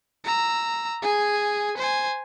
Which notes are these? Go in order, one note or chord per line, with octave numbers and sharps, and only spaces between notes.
A#5 E6
G#4 G#5
C5 G#5